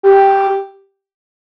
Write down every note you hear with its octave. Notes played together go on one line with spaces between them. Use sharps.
G4